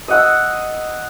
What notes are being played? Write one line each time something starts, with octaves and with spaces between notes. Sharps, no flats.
D#5 F#5 E6